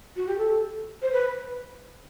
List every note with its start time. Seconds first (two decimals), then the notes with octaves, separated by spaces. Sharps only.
0.16 F#4
0.27 G4
0.38 A4
1.02 C5
1.12 B4